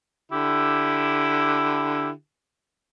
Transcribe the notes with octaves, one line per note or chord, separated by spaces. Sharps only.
D3 E4 G4